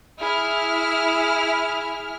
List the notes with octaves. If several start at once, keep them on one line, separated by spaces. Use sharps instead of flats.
E4 G#4 F6